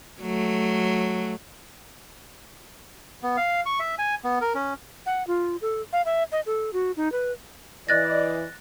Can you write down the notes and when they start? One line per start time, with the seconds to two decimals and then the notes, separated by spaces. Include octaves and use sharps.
0.21 F#3 A3
3.23 B3
3.37 F5
3.66 C#6
3.80 E5
3.99 G#5
4.24 B3
4.41 A#4
4.55 C#4
5.06 F#5
5.27 F4
5.62 A4
5.93 F5
6.05 E5
6.32 D#5
6.46 A4
6.73 F#4
6.97 D#4
7.12 B4
7.89 E3 D5 D#5 F#6 A6 A#6